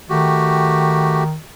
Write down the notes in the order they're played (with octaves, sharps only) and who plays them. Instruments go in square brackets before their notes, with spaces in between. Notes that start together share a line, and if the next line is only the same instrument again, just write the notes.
[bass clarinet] D#3 [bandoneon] A3 F#4 G4